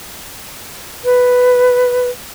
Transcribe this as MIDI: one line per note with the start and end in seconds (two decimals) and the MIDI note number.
1.05 2.09 71